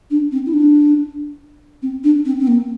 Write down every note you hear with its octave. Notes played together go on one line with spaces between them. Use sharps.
D4
C4
E4
D4
C4
D4
C4
C4
A#3